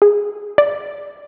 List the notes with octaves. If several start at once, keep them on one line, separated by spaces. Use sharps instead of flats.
G#4
D5